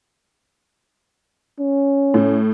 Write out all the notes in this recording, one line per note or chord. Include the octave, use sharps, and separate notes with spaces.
C#4
A2